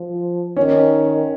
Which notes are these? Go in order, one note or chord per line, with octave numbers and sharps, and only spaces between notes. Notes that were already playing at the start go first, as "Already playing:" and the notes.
Already playing: F3
D#3 C#4